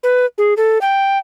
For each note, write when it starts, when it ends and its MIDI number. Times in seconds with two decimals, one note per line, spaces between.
0.03 0.26 71
0.38 0.54 68
0.57 0.78 69
0.81 1.18 79